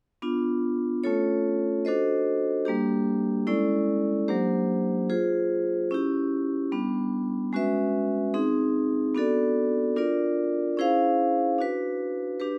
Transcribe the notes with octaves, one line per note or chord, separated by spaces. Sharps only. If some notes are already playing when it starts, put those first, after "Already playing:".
B3 D4 F4
A3 C#4 F4 A4 C#5
D4 F#4 A4 C5 D#5
G3 A#3 D4 G4
G#3 C#4 E4 A4 D5
F#3 A#3 D4 G4 C5
F4 G#4 C5
C#4 E4 G4
G3 B3 D4
G#3 C#4 F#4 B4 E5
C4 D#4 G#4
B3 D4 F#4 A4 D5
D4 F4 A#4 D5
C#4 E4 G#4 C5 F5
D4 F#4 B4
D4 G4 B4